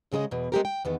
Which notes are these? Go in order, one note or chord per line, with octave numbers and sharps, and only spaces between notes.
D2 C#3 G#3 A4 D#5
E2 B2
G#3 A3 C4 G4 A4 A#4
G5
E2 D#3 B3